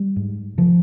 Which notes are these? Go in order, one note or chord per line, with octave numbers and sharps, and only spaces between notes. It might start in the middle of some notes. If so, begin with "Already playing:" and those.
Already playing: G3
G#2
C3 F3